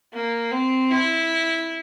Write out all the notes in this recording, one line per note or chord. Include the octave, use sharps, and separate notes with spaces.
A#3
C4
E4